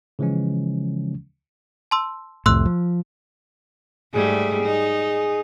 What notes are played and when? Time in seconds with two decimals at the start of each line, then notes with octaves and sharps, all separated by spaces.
0.19 C#3 E3 F3 G#3 C#4
1.91 A5 C6 E6
2.46 C2 F2 A2 C6 E6 F#6
2.65 F3
4.13 G#2 G3 A3 G#4
4.64 D#4